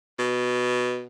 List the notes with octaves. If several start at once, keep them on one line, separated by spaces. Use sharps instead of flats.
B2